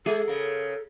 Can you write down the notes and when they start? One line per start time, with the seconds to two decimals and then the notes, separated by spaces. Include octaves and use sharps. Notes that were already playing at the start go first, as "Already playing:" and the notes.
0.06 G#3 G#4 A4
0.28 C#3 A#4